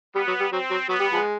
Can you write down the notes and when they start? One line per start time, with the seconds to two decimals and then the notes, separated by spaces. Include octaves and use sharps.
0.15 G3 B3
0.27 F#3
0.40 G3
0.51 F#3 C4
0.71 F#3
0.89 F#3 B3
1.00 G3
1.12 F3 G#3